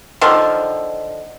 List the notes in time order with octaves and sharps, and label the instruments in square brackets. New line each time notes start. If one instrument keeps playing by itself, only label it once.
[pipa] D3 D#3 F3